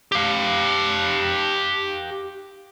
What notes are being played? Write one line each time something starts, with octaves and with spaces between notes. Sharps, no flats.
G4 F5